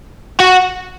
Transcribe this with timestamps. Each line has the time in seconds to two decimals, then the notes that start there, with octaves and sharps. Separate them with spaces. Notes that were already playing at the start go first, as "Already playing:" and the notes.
0.40 F#4